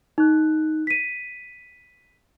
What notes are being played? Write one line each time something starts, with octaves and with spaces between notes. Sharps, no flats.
D#4 F#6
B6 D#7